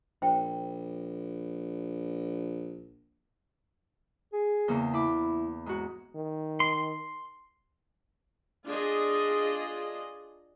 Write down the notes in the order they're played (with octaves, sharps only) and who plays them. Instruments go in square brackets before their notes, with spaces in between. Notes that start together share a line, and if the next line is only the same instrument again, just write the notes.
[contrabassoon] A#1 [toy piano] C5 G5
[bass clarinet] G#4
[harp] E2 C#3 A#3
[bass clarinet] E4 [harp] B5 D6
[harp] G#2 F#4
[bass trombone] D#3
[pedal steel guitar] C6
[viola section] D4 F4 G#4 D#5